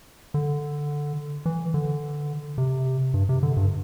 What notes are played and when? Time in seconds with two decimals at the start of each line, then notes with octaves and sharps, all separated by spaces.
0.34 D3
1.46 E3
1.74 D3
2.58 C3
3.14 G2
3.29 C3
3.43 D3
3.57 G2